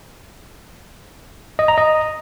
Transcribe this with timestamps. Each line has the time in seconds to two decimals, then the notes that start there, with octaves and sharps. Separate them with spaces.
1.59 D#5
1.68 A#5
1.78 D#5